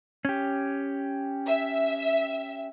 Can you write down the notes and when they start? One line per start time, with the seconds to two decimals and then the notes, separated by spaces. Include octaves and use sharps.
0.25 C#4 G4
1.47 E5